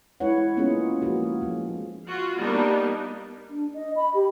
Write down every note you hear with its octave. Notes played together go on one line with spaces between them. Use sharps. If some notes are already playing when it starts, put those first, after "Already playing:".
G#3 E4 B4 C#5 F#5
A#3 B3 C#4 D#4 F4 G#4
F3 G#3 A#3 F#4 G#4
F3 G#3
F4 F#4 F5
G3 A#3 B3 D4 D#4
D4
D#5
B5
G4